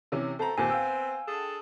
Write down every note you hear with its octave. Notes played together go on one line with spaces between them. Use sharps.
C3 E3 C#4
B2 A3 C4 A4 A#5
D#2 A#2 B3 C4 G#5
F5 G5 E6
D4 G#4 A4